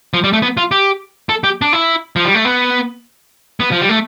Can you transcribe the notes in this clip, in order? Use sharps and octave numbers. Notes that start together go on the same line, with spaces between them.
F3
G3
A3
B3
F4
G4
A4
G4
D4
E4
F3
G3
A3
B3
B3
F3
G3
A3